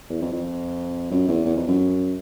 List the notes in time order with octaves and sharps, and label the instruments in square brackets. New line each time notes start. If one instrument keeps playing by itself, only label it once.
[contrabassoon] E2
F2
F2
F#2
E2
E2
F2
F#2